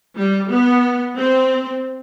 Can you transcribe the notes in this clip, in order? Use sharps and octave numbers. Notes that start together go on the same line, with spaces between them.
G3
B3
C4